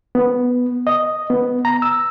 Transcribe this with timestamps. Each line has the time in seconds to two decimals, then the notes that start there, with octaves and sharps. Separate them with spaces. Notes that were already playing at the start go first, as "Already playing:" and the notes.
0.15 B3
0.87 D#5
1.30 B3
1.65 A#5
1.82 E6